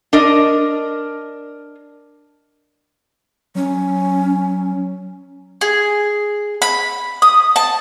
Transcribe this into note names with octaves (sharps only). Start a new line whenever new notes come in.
D4 A#4 D#5
F#3 C#4
G#4
B5
D#6
A5